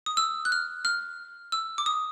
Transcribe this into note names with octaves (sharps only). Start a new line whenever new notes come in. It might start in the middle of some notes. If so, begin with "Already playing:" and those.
D#6
E6
F#6
F6
F6
E6
D6
D#6